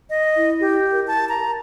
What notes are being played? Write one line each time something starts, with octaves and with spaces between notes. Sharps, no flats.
D#5
E4
G4
A#4
A5
A#5